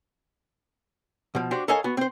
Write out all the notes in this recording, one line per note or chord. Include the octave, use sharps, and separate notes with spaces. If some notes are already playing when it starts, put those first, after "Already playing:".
B2 F3
D4 F#4 G4 C5
A4 A#4 C#5 D#5 F5 G#5
B3 F#4
C4 C5